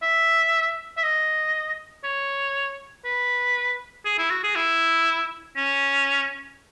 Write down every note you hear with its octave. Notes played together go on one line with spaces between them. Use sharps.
E5
E5
D#5
C#5
B4
G#4
E4
F#4
G#4
E4
C#4